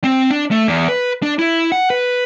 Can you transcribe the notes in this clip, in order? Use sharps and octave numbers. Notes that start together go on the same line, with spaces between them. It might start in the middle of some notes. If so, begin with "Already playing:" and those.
C4
D4
A3
E2
B4
D4
E4
F#5
B4